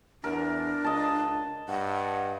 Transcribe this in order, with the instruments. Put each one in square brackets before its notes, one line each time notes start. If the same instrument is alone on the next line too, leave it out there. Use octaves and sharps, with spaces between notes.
[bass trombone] E2 [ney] D4 [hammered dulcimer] A#4
[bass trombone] C#2 [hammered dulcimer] D#5 A5
[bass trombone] G2 [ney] F#5